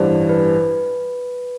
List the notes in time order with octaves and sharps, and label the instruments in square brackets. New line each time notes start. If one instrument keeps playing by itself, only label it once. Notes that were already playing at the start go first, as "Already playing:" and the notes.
Already playing: [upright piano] A1 G2 E3 G3 D4 [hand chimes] C5
[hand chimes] B4